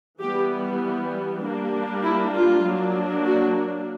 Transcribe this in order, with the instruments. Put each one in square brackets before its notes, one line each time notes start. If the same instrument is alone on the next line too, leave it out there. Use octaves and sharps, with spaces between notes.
[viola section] E3 G3 B3 G4
G3 A#3 D4
E4
F4
F#3 A#3 D4
F#4